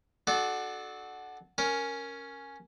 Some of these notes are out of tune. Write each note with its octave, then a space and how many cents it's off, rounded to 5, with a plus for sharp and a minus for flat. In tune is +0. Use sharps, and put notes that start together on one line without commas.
D4 +25 F#4 +0 A4 -25
C#4 +0 A#4 +0